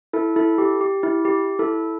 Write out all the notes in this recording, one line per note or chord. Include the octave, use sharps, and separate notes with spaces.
E4 A4
E4 A4
G4
G4
E4
G4
E4 A4